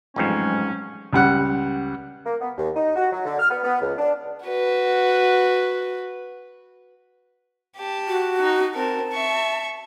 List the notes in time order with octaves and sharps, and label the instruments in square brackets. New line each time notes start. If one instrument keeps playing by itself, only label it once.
[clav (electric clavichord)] A1 F2 G#2 [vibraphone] F#3 G#3 C5 [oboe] C#4
[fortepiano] C#2 G3 F#5 F#6
[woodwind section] A#3
B3
D#2
D#4
F#4
F#3
D3
F6
B3
B3
C#2
D4
[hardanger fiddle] F#4 B4
G4 A5
[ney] F#4
[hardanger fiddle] D#4
[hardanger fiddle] C4 A#4 [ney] A5
[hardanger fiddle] E5 C#6